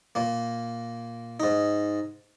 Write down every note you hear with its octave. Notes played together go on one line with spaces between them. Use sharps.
A#2 A#3
G#2 D#4